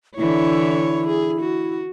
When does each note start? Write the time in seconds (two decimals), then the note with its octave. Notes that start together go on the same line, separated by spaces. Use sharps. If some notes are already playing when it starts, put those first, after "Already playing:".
0.17 D3 E3 E4 C#5
1.08 G#4
1.40 F#4